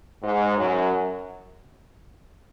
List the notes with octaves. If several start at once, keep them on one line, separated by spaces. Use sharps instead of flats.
G#2
F#2